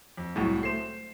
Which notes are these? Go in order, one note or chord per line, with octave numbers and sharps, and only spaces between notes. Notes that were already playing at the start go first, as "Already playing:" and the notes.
F2
C2 A2 F#3 G#3 F#4
A3 C5 C7 E7